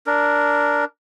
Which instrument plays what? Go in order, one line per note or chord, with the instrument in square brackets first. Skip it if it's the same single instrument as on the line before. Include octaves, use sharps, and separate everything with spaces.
[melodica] D4 A#4